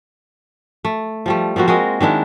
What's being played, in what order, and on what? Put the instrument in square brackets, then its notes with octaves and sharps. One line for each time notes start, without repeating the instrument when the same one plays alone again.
[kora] A3
F3 G3 A3
F3 A#3 C4 F#4
G#3 F#4 A#4 D#5
D#3 G#3 D4 E4